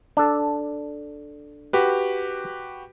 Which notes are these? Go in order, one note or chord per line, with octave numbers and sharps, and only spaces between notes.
D4 A4
F#4 G4 B4